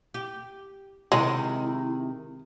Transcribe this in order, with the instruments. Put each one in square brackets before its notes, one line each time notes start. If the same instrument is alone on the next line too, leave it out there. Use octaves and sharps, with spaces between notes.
[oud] G4
[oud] C3 D#3 [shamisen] G#3 [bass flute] E4